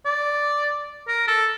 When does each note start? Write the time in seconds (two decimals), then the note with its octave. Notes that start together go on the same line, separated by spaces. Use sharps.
0.05 D5
1.08 A#4
1.28 A4